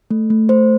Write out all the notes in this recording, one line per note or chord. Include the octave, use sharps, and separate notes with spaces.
A3
A3
A3 C5